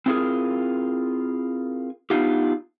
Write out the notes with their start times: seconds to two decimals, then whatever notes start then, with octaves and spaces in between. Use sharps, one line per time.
0.06 C4 E4 F4 G4 G#4 A#4
2.10 B3 D4 D#4 F4 G4